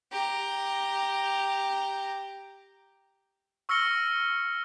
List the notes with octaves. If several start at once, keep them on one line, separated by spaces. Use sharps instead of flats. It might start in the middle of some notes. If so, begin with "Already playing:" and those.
G4 A#5
C#6 E6 F6 A#6 C#7 G7